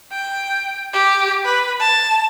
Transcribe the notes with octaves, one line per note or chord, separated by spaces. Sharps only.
G5
G4
B4
A5